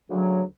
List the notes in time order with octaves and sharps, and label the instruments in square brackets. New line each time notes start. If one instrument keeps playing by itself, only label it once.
[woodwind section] D2 C#3 F#3